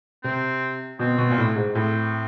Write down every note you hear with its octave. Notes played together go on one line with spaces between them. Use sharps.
C3 C4
B2 C4
B2
A#2
A2
G#2
A2 C4